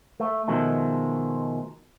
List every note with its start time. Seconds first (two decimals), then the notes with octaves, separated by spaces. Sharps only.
0.20 A3
0.48 B2 D#3 F3 G#3 A3